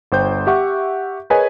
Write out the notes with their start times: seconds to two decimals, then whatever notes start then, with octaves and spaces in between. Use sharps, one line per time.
0.12 G1 C5 G5 G6
0.47 G4 E5 F#5 C#6
1.30 G#4 A#4 B4 C#5 D#5 G#5